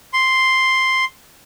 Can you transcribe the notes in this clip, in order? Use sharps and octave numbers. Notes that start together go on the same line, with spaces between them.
C6